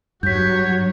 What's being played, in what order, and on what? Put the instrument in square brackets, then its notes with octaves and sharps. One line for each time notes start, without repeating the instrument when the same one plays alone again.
[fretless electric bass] G2 [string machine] F#3 [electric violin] F#4 C#5 [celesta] G6 B6